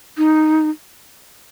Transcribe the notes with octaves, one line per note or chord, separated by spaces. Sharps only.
D#4